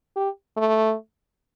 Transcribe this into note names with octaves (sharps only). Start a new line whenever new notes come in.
G4
A3